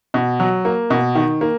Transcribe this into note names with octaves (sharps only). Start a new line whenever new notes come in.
B2
F#3
A#3
B2
D#3
A#3